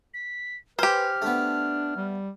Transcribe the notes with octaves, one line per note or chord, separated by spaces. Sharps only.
B6
G4 B4 C5 G#5 F6
A3 B3 D4
G3